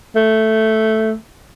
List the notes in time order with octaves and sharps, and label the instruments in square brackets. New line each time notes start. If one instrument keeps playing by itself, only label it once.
[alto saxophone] A3